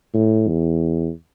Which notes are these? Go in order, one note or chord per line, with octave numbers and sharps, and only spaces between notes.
A2
E2